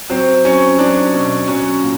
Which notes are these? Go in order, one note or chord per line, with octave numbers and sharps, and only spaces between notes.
F#3 C4
F#3 C#4
F#3 D4
B2
F#3 C#4
A#2